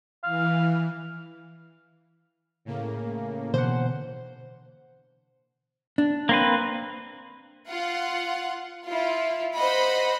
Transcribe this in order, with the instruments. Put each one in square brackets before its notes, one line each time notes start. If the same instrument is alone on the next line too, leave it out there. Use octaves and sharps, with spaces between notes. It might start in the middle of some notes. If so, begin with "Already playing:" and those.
[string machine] E3 [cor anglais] F5
[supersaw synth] A2 C#3 A#3
[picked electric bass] B2 D3 E3 [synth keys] C5 F#5
[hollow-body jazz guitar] D4
[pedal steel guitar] A#3 C4 B4
[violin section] F4 F#5
E4 F4
C5 D#5 F#5 B5